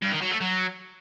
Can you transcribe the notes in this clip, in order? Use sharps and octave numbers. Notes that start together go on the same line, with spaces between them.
G2
D#3
F#3
A3
F#3